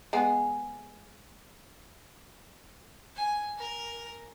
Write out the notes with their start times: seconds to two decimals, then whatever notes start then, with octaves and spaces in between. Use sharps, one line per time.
0.13 G#3 B3 G#4
3.15 G#5
3.58 A#4